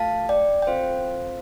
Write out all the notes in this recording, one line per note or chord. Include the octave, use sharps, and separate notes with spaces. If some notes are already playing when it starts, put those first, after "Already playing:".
Already playing: A3 F4 A4 F5 A5
D5 G5
G5
C4 F4 A4 C5 F5